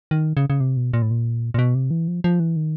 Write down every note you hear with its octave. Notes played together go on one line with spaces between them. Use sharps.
D#3
C#3
C#3
C3
B2
A#2
A2
A#2
A#2
B2
C3
E3
F3
F3
E3
D#3